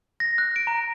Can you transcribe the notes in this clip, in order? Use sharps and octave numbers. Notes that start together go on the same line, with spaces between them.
A#6
F#6
D7
A#5